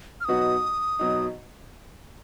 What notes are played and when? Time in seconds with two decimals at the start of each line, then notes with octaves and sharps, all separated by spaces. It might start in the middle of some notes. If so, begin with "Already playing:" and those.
0.21 F6
0.25 B2 F#3 B3 D#4 F#4 D#6
0.99 B2 F#3 D#4